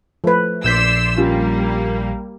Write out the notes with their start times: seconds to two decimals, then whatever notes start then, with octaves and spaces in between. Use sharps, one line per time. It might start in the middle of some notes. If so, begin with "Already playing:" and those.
0.24 F3 A3 B4
0.64 A#1 D5 C6 E6 G6 B6
1.16 G3 A#3 C#4 F4 G4